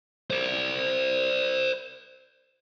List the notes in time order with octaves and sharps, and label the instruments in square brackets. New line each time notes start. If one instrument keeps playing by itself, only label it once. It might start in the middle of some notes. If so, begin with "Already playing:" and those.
[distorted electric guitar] C5 D5